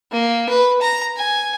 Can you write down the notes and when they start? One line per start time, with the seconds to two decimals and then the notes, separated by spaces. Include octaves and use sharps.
0.12 A#3
0.49 B4
0.81 A#5
1.17 G#5